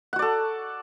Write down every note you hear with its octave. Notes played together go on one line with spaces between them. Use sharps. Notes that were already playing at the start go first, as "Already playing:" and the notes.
F#4 A4 D5 F#5